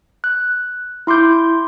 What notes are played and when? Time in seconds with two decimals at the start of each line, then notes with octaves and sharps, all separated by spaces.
0.24 F#6
1.07 E4 C6 D6 G6